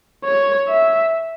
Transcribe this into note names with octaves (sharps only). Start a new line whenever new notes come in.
C#5
E5